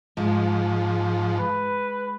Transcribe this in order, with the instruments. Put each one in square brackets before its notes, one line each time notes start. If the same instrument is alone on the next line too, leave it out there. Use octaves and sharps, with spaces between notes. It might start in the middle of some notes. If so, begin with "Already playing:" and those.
[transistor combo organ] G#2 F3 [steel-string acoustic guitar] G#3
[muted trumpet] B4